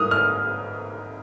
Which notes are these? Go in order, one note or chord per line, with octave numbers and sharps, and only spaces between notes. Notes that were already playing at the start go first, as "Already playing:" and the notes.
Already playing: G#2 G3 A#3 D#6 F6
F6